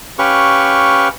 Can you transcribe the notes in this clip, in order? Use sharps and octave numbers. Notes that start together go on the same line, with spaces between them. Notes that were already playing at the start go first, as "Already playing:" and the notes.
C#4 G4 B4 F5 C#6